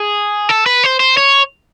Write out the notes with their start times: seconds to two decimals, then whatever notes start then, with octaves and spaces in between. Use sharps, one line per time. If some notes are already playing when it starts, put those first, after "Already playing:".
Already playing: G#4
0.49 A4
0.66 B4
0.84 C5
1.00 C5
1.17 C#5